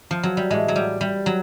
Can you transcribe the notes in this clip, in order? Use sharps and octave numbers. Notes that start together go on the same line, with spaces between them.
F3
F#3
G3
A2 E3 G#3
F#3
G3
G3
F#3